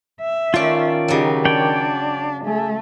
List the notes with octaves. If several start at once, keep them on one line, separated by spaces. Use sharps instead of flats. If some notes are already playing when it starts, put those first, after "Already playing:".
E5
D#3 A3 C#4 F4 D5
C#3 F#3 D#4 G4
D4 C#5 D5 G5
A3 G#4